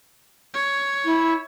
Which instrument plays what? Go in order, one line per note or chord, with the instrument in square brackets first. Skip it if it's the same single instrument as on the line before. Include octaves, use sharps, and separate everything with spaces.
[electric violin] C#5
[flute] E4